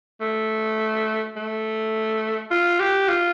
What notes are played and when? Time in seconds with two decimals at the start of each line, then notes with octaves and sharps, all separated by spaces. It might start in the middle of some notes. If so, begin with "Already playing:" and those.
0.21 A3
1.36 A3
2.51 F4
2.80 G4
3.08 F4